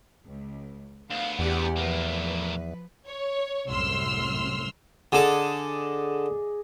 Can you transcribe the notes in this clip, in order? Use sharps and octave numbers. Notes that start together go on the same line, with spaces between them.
C#2
D2 B3 F5
E2 G4 D5 F#5
A2 F3 A#3 B4
C#5
C2 F#2 A2 C6 E6 F6
D3 G#4 A4 D5 D#5